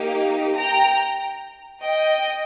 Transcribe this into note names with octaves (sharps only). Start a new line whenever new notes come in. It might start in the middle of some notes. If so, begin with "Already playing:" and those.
Already playing: A#3 D#4 G4
G5 A#5
D#5 G5